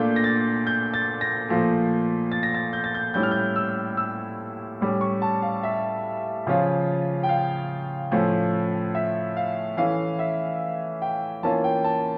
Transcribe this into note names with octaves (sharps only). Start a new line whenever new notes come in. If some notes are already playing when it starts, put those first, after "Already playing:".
Already playing: A#2 A3 D4 F4 G6
A#6
A6
G6
A6
A#6
A#2 F3 A3
A6
A#6
A6
G6
A6
G6
A2 G3 C#4 E4 G6
F6
G6
E6
E6
A2 G3 C#4
C#6
A5
F5
E5
C#3 F3 C#4 F4
G5
F5
A2 F3 A3 C#4
E5
F5
E3 A3 C#4 F5
E5
G5
E3 A#3 C#4 F4 A5
G5
A5